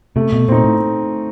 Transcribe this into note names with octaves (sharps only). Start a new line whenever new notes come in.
C3 A3
B2
A#2 C4 D#4
A2